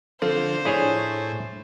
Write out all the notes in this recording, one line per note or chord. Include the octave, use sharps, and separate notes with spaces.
D3 F3 C4 F4 A4 C5
A2 D4 E4 G#4 C#5